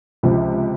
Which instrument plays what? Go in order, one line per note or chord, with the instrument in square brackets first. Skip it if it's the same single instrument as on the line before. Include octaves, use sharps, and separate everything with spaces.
[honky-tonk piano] C#2 C3 F3